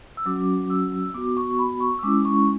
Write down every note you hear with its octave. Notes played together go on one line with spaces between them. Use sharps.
E6
F#3 C#4 F#4 D6
E6
B3 F#4 D6
C#6
B5
C#6
E6
G#3 C#4 E4 D6
C#6